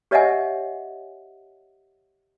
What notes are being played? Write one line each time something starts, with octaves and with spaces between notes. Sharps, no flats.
G4 C#5 D#5 E5 F#5 G#5